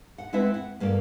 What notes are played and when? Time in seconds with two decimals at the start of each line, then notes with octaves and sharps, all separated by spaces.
0.18 F#5
0.33 G#3 C4 E4 B4 E5 F#5
0.54 F#5
0.80 G2 A#3 C#4 A4 D5